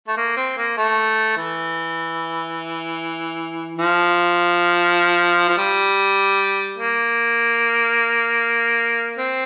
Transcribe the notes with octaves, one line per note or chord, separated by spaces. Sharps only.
A3
A#3
C4
A#3
A3
E3
F3
F3
G3
A#3
C4